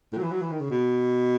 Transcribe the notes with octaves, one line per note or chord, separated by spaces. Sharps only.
A2
F#3
E3
F#3
E3
D#3
C#3
B2